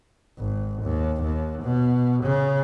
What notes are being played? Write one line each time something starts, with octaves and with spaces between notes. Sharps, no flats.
G#1
D#2
D#2
B2
C#3